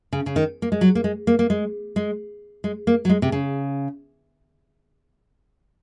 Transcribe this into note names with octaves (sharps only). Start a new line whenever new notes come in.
C#3
C#3
D#3
A#3
G#3
F#3
A#3
G#3
A#3
A#3
G#3
G#3
G#3
A#3
F#3
G#3
C3
C#3